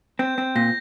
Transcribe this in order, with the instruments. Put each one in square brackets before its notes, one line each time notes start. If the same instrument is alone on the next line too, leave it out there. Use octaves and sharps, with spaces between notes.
[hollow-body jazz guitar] C4 [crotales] G6
[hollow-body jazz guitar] C4
[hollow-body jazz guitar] A#2 [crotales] A#6